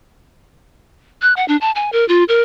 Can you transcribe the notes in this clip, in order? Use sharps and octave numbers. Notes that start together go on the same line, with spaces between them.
F#6
F#5
D4
A5
G#5
A#4
F4
A#4